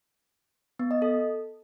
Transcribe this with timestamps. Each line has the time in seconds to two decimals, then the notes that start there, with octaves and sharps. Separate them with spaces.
0.79 B3
0.91 D#5
1.02 A4